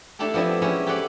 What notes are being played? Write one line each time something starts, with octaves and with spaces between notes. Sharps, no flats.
A3 D4 E4 G4 A4
F3 B3 C4 D4 E4
G#3 C#4 E4 G4 G#4
G4 A4 B4 C5 D5 F#5